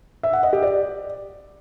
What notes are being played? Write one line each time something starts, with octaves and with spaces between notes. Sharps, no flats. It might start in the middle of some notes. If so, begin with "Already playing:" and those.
E5
F#5
D#5
G4
D5